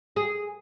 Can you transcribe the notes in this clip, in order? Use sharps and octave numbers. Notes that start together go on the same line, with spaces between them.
G#4